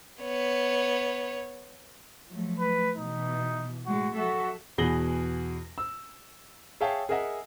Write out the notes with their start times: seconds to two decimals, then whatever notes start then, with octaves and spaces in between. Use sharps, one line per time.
0.21 B3 C#5
2.29 F3 F#3 A3
2.60 B4
2.97 B2 E3 D#4
3.86 A2 G#3 A3 F#4
4.16 F#3 F#4 A4 E5
4.78 E2 B2 G#4 A#6 F#7 G7
5.78 E6
6.81 G#4 C#5 E5 F5 G5 A5
7.09 G#4 A#4 D#5 E5 F#5 G#5